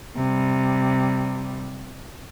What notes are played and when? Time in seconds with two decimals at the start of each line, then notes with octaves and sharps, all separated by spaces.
0.16 C3 G3